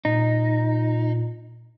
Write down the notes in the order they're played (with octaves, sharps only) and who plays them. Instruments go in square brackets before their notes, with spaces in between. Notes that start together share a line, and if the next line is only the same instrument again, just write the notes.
[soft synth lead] A#2 [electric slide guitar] D#4